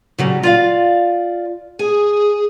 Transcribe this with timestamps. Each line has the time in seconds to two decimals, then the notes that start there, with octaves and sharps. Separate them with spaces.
0.19 C#3 F#3 G3
0.43 F4 D5 F5
1.79 G#4 G#5